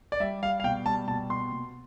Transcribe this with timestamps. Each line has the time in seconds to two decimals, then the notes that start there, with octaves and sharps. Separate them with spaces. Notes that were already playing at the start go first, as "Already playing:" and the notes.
0.12 D5
0.20 G3 E5
0.42 G3 F5
0.60 F5
0.64 B2 G5
0.86 G3 A5
1.08 B2 A5
1.30 B2 C6
1.52 B2